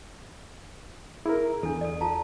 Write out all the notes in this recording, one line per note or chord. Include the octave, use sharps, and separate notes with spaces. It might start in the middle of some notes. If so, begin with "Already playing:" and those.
E4 G#4 A#4
E2 D4 A4
A4 D5
F4 A5 A#5